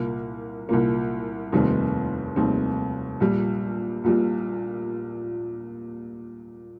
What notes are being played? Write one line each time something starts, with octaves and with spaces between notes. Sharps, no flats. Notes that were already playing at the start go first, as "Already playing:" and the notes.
Already playing: C2 A#2 A#3
C2 A#2 A#3
F1 D#2 D#3 G3 C4
F1 D#2 D#3 G3 C4
A#1 A#2 G3
A#1 A#2 G3